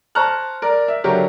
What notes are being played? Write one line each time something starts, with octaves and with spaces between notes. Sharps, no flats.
C5 A5 A#5 C#6 F6 F#6
A#4 D5
E5
D3 F#3 G4 A#4 C#5